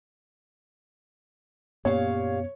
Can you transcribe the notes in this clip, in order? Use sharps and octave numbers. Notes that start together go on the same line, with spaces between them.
F#2 A#2 B3 G4 C#5 F5